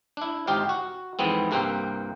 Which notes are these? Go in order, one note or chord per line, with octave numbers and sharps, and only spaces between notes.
D4 E4
G#1 D#4 F4 G4 C5 F5
F#4
F2 G#2 E3 B3 C4
C2 G2 A#3 C5 E5 G5